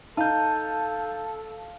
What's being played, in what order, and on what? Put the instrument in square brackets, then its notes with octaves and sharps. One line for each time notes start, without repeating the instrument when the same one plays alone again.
[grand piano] D#4 [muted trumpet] A4 [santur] F5 [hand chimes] A5 G6